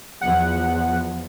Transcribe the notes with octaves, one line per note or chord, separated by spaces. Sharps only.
E2 F3 F#5